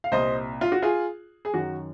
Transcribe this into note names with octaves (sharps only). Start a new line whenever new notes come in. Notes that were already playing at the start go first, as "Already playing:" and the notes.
F5
C2 A#2 C5 D#5
F4
F#4
F4 G#4
G#4
F#2 D#3 F#4